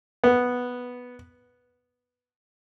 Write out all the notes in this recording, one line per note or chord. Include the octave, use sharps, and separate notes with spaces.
B3